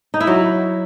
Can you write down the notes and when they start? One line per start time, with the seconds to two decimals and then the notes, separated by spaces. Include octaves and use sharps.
0.14 D#4
0.20 E4
0.27 F#3